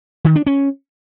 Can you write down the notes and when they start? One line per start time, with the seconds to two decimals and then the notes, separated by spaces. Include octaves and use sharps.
0.25 D#3
0.36 D4
0.47 C#4